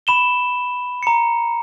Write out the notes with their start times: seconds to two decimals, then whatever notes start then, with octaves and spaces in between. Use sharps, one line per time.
0.07 B5 E7 G7
1.03 A#5 C#7